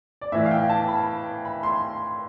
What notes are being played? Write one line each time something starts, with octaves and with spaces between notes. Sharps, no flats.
D5
A2 E3 E5
F5
G5
A5
B5
B5
C6